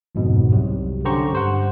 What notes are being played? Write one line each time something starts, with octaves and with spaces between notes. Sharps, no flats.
G1 F2 G#2 B2
C2 C3 F#3
D3 C#4 G4 C5 A#5 C#6
G2 C5 F#5